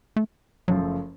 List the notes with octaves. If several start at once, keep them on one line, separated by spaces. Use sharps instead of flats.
A3
F#1 F#2 F3 F#3 A3